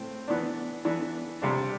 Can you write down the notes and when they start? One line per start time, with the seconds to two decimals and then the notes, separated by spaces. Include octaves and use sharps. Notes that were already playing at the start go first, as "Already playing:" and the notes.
Already playing: A2 C4
0.28 E3 B3 D4
0.85 E3 B3 D4
1.42 C3 G3 D4